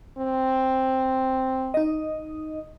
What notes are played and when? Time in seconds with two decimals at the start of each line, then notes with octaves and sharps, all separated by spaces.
0.18 C4
1.74 D#4 D#5